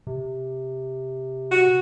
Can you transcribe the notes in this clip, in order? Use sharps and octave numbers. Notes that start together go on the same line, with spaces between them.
C3
F#4